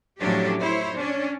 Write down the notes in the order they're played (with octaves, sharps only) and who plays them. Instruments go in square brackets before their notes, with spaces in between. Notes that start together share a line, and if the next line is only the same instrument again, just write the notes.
[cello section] A2 F3 F#3 C#4 D4 G4
E4 C5 C#5
C#4 D4